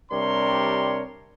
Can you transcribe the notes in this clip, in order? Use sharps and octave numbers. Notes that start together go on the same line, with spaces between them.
C3 G3 D4 A#4 C#5 C6